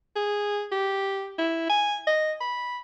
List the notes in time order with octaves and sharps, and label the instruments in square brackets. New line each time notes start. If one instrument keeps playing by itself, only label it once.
[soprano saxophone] G#4
G4
E4
G#5
D#5
B5